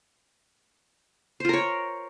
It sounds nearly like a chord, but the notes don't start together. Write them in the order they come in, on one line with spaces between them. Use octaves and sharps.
C5 F4 A#4 C#5